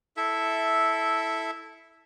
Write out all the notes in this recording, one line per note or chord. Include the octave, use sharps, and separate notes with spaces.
E4 A4 E5